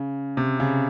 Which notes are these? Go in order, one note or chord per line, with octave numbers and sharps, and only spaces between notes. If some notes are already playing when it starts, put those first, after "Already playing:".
Already playing: C#3
C3
C#3